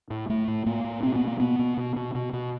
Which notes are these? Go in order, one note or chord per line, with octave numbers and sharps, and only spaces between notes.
A2
A2 A3
A2
A2 A#3
A2
B2 C4
B3
B2
A#3
B2 B3
B2
B2
B2
B2
B2